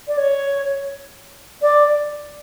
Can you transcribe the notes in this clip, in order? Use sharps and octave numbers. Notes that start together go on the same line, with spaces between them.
D5
C#5
D5